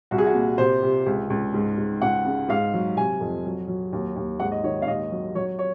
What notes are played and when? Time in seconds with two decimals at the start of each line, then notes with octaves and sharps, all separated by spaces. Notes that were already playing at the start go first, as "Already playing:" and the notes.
0.11 C2 F#4
0.18 G#4
0.26 F#4
0.35 A#2
0.58 C3 C5
0.83 C3
1.06 C#2
1.30 C#2
1.54 G#2
1.78 G#2
2.02 C#2 F#5
2.25 C#3
2.49 G#2 F5
2.74 F#3
2.97 C3 G#5
3.20 F2
3.45 F#3
3.68 F#3
3.93 D#2
4.16 D#2
4.40 G#2 F#5
4.52 D#5
4.64 D#3 C#5
4.82 F5
4.87 D#2 D#5
5.12 F#3
5.35 F#3 C#5
5.59 C#5